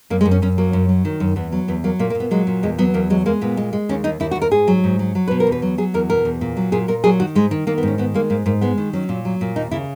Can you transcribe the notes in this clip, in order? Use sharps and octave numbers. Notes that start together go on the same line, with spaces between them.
F#2 A#3
G#3
F#2
C#4
F#2 C#4
F#3 A#3
F#2
F#3
D#3
F#2
E2 B3
F#3
E2 B3
F#3 A#3
A#2 A#3
A#3
A#2
B3
F#3 G#3
A#2
E2 G#3
F#3 B3
E2 A#3
F#3 G#3
G#3 A#3
A#2 B3
G#3
G#3
D#2 C#4
D#2 D#4
D#2 E4
F#4
D#2
A#4
G#2 G#4
F#3
G#2
F#3
F#3
B2 B4
A#4
E2
B4
F#3
F#3 G#4
E2 A#4
B2 A#4
E2
A#2
F#3
A#2 G#4
A#2 A#4
F#3 G#4
D#3 F#4
G#2 G#3
D#3
D#3 A#3
B3
G#2 C#4
D#3 B3
G#3 A#3
G#2 A#3
G#2 A#3
G#3 B3
D#3
F#3 C#4
A#2
F#3
A#2
D#2 D#4
C#3 E4